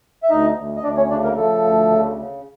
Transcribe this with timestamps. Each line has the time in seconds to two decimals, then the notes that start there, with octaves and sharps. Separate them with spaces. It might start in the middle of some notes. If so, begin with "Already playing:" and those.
0.23 E5
0.30 D2 D#4 D#5
0.57 D2
0.76 D#5
0.83 D2 D4 D5
0.97 C#4 C#5
1.10 C#3 D4 D5
1.24 A#3 A#4
1.37 F3 A3 A4
1.64 D2
1.90 C#3
2.17 C#3